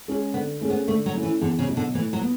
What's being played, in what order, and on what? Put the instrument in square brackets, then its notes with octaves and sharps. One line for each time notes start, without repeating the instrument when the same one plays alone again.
[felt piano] G#3 C#4 G#4
[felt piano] D3 [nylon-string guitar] B3
[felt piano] A3 C#4 G#4
[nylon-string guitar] B3
[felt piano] D3 [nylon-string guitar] A3
[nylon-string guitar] F#3
[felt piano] A3 C#4 E4
[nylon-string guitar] E3
[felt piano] E2 [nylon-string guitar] D3
[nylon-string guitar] C#3
[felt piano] B2 F#3
[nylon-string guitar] D3
[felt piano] A2 [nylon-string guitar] E3
[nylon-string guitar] F#3
[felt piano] B3